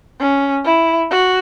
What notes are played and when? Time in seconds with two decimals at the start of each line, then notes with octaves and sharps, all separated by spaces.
0.20 C#4
0.65 E4
1.10 F#4